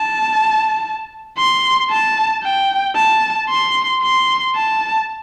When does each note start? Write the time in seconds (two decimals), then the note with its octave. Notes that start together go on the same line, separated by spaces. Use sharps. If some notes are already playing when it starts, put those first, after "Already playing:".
Already playing: A5
1.38 C6
1.91 A5
2.43 G5
2.96 A5
3.49 C6
4.03 C6
4.56 A5